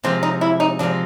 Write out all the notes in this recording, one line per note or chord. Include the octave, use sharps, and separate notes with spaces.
C3 F3 G#3 C4
D#4
E4
D#4
C3 F3 G#3 D4